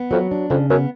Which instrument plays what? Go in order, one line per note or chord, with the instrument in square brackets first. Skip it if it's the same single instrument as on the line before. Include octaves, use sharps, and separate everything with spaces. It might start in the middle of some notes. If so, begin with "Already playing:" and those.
Already playing: [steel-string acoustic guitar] B3
[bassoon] F2 [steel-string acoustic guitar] F#3
[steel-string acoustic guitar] D4
[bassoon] F2 [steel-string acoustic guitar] C#3
[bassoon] F#2 [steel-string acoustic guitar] B3